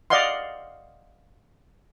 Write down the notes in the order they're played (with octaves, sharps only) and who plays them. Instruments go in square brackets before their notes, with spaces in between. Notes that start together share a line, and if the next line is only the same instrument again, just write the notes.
[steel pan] D5 D#5 F5 F#5 C6